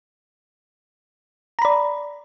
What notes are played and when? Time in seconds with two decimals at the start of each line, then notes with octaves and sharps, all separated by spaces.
1.59 A#5
1.62 B5
1.65 D5